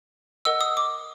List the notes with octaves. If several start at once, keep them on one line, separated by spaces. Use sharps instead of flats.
A#4 D#5 F#5 E6
D#6
D6